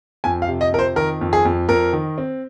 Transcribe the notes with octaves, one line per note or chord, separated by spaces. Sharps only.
F2 G#5
F5
C3
D#5
F2 A#4
C5
D#3 A#4
F2
G#4
F2
F2 A#4
D#3
C4